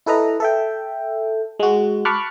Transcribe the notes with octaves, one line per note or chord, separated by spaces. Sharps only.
E4 A4 B4 D#5 A#5
A4 E5 G5
G#3 F#4
A5 B5 C#6 D6 F6 F#6